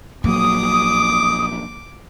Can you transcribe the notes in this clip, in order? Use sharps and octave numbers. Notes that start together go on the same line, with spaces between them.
A#1 F#3 A#3 D6 D#6